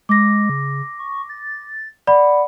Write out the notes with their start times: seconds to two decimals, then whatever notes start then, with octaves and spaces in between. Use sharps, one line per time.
0.09 G#3 D6 A#6
0.49 C#3
0.99 C#6
1.29 A6
2.07 D5 F#5 B5